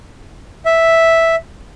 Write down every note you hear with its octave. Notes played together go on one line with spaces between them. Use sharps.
E5